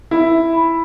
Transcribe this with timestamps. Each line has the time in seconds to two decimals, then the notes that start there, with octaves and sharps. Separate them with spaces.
0.11 E4 E5
0.32 E5
0.53 B5